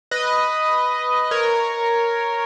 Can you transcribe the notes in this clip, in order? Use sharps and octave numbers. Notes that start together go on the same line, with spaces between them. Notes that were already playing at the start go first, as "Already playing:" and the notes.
B4 D#5
A#4 C#5